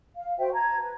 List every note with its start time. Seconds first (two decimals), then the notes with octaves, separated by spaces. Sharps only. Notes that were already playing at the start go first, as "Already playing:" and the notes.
0.16 F5
0.38 F#4 C5 E5 G5
0.53 A5 A#5 G#6
0.78 B4